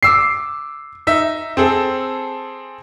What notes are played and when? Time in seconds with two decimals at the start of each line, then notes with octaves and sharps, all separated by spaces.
0.03 D6 E6 C7
1.07 D#4 E5
1.57 C4 G#4 A4